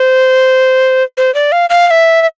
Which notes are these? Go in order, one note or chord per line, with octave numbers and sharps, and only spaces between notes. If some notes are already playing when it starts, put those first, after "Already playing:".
Already playing: C5
C5
D5
F5
F5
F5
E5
E5